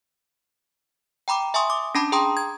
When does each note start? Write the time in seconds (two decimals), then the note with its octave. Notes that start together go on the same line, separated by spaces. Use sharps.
1.28 G5 A#5 B5 D6
1.54 E5 G#5 C6 C#6 D#6
1.70 D6
1.95 C#4 D4 A5 B5 D6
2.12 G#4 G5 A#5 C6 D#6
2.37 G#6